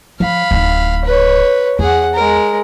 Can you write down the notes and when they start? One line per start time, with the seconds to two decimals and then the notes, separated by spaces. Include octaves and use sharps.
0.20 F3 F5 B5
0.51 D1 D#4
1.05 B4 C#5
1.79 E2 G#4 F#5
2.14 G#3 A#4